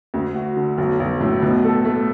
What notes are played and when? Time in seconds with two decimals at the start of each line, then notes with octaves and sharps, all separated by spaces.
0.14 D2
0.35 F#4
0.57 D3
0.78 B1
1.00 B1
1.20 A2
1.42 B2
1.64 A4
1.85 A3